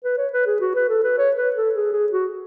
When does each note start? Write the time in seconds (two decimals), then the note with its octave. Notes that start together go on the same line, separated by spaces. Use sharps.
0.05 B4
0.18 C#5
0.33 B4
0.47 G#4
0.61 F#4
0.75 B4
0.89 A4
1.04 B4
1.18 C#5
1.37 B4
1.56 A4
1.75 G#4
1.93 G#4
2.12 F#4